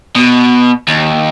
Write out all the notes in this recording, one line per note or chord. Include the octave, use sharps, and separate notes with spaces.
B2
D#2